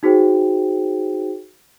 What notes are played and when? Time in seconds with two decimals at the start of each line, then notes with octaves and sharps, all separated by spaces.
0.03 D#4 F#4 G#4 C5 G5